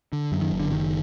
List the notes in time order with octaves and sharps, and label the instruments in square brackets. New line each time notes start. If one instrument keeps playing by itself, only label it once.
[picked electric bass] D3
F#2
D#3
F#1
D3
F#1 D#3